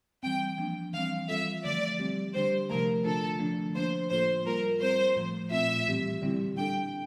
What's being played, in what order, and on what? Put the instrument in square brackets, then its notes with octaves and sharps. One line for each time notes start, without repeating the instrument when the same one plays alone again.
[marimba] E3 G3 C4 [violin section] G5
[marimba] F3 A#3 D4
[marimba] E3 G3 C4 [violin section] F5
[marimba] E3 G3 C4 F4 A4 [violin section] E5
[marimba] D3 F3 A3 [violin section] D5
[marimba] G3 C4 G4
[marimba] D3 G3 D4 G4 [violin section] C5
[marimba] C3 F3 A3 [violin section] A#4
[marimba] D3 A3 D4 F4 [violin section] A4
[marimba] D3 F3 A3 D4
[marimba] F3 A#3 D4 [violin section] C5
[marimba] A2 F3 A#3 F4 A4 [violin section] C5
[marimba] G3 A#3 F4 [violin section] A#4
[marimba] G3 C4 F4 [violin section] C5
[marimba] A2 F3 A3
[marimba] A#2 A3 C4 F4 [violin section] E5
[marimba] A2 E3 G3 C4 G4
D3 G3 C4 E4 G4
[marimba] G3 D4 A4 [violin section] G5